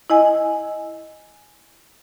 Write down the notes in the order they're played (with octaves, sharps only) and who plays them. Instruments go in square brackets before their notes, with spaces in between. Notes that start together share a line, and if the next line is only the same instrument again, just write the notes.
[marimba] E4 D#5 G#5